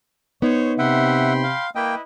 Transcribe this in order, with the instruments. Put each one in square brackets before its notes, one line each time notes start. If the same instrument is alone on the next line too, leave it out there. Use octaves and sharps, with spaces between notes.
[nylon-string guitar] B3 D#4 [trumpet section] C5 C#5
[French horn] C3 [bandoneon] E5 F#5 [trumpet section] G5 B5 C6
[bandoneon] F5
[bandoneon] A#3 G5 [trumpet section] E4 B4 D#5